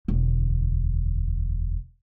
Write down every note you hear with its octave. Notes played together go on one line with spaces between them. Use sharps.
E1 D2